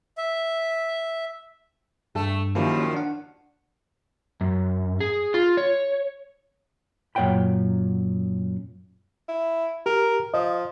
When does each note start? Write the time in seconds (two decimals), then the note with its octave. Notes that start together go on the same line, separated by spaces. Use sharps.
0.18 E5
2.15 G2 A3 A4
2.55 F#2 D#3 F3 A#3 E4 G4
2.93 D4 F#5
4.41 F#2
5.01 G#4
5.34 F4
5.57 C#5
7.15 F#2 A#2 C#5 F#5 G5 B5
9.29 E4
9.86 G4 A#4
10.34 F3 D#5